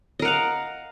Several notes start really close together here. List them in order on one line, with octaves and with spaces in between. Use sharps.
D#5 A#4 F#5 F5